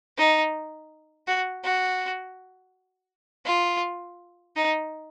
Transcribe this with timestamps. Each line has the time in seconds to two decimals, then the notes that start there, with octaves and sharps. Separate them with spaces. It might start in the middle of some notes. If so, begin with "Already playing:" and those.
0.18 D#4
1.27 F#4
1.64 F#4
3.46 F4
4.56 D#4